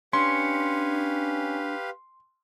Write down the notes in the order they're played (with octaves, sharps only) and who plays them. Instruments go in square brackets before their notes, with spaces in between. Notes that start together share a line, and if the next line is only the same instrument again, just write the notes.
[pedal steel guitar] C#4 [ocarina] D4 [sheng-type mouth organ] G4 B4 F5 [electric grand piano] C6